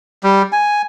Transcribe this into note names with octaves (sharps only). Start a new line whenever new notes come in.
G3
G#5